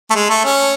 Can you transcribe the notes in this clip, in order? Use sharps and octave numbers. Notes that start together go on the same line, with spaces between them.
A3
G#3
A3
C#4